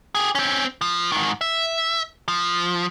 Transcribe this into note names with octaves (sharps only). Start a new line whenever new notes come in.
G4 G#4
C4 C#4
F3
G#2 D#3
E5
F3